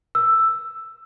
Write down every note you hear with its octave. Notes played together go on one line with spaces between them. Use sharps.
E6